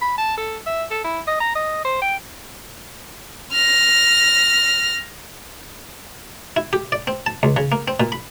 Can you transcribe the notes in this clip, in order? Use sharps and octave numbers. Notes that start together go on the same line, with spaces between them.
B5
A5
A4
E5
A4
E4
D#5
A#5
D#5
C5
G5
F6 A#6
E4
G4
D5
C4
A5
C#2
C#3
A#3
C4
A#2
B5